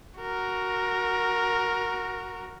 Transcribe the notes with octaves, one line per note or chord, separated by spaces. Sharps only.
F#4 A#4